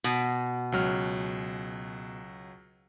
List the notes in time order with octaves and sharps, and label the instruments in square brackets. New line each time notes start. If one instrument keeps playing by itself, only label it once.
[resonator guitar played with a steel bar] B2
[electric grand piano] C#2 F#3 F6